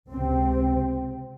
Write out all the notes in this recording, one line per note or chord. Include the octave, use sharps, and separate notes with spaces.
C#2 C3 C4